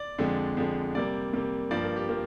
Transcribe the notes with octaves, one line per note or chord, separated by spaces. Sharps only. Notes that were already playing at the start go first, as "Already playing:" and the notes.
Already playing: D5
F2 D3 F3 G#3
F2 D3 F3 G#3
C3 G3 A#3 D5
C3 G3 A#3
G2 F3 A#3 D5
A#4
G4
F3 A#3 A#4